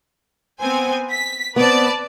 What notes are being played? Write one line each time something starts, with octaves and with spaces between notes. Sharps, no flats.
B3 C4 G#5
B6
B3 C4 B4 D5 A5